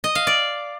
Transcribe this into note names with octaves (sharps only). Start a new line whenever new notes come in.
D#5
F5
D5